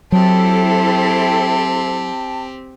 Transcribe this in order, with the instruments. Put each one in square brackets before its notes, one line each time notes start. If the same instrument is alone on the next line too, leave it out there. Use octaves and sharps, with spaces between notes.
[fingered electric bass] F#3 [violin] C4 G4 [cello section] E4 A4 C5 [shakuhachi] A5